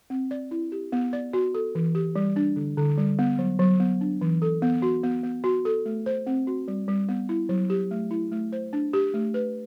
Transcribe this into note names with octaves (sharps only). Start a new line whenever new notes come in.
C4
D5
E4
G4
B3
D5
F#4
A4
E3
G4
G3
D4
D3
D3
G3
B3
F#3
F#3
B3
D4
E3
A4
B3
F#4
B3
B3
F#4
A4
A3
C5
C4
F#4
G3
G3
B3
E4
F#3
G4
A3
E4
A3
C5
D4
G4
A3
B4